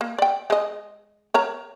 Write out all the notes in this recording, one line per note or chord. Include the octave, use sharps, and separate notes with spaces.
A#3
D5 G5
G#3 D#5
A#4 C#5 A#5